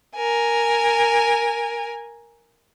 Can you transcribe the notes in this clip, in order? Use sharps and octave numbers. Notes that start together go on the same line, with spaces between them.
A#4 G#5